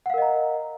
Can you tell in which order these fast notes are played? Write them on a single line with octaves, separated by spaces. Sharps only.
F#5 F5 A#4 D#5 A#5